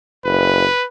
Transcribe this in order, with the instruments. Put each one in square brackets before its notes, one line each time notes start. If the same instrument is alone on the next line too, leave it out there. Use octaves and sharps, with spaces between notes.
[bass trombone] F#1 [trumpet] B4